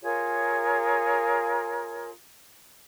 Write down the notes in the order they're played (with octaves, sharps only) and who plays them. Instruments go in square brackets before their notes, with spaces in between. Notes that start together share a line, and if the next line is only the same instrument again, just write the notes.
[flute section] F4 G#4 A#4 C#5